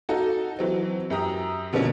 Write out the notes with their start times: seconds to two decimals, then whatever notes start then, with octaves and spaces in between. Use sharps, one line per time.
0.09 D#4 F#4 A4
0.59 E3 F#3 C4
1.10 F#2 G4 A#5 D#6
1.73 B2 D3 F3 A#3 C#4